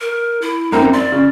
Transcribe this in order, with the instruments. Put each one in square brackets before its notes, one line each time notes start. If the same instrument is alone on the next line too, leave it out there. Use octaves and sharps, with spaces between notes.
[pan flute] A#4
E4
[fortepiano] F#2 A#3 C4 [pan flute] D#4
[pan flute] D5 [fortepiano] C6
[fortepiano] C#3